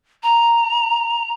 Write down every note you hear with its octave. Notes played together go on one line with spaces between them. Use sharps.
A#5